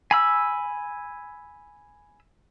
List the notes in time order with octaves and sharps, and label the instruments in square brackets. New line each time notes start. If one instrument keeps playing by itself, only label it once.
[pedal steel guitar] G#5 B5 E6